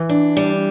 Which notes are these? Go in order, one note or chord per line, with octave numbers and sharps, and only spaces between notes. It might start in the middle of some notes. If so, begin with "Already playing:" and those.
Already playing: E3
D4
G3